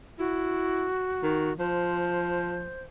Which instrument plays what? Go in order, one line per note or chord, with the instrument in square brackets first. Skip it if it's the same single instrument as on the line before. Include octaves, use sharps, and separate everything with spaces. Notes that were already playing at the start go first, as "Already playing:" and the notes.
[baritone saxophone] E4 [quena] F#4
[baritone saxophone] D#3
[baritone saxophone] F3 [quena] C5